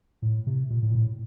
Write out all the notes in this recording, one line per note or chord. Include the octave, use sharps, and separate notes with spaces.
A2
C3
A#2
A2
A#2
A2